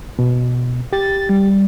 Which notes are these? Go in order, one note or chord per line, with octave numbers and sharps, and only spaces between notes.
B2
G4 A6
G3